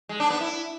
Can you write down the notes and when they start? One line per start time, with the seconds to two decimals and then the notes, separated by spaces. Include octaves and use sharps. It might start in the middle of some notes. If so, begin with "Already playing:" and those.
0.09 G#3
0.20 D4
0.30 B3
0.41 E4